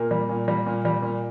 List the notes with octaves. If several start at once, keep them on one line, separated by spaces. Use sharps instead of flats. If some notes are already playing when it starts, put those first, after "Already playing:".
Already playing: A#2 A#3
G3
A#2
G3
A#2
G3
A#2